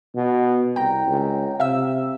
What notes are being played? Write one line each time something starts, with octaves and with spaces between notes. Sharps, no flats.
B2
C2 G5 A#5
C#2
C3 E5 F5 E6